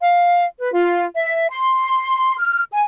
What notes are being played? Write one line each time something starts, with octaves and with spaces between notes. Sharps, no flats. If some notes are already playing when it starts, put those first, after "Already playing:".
F5
B4
F4
E5
C6
F6
G#5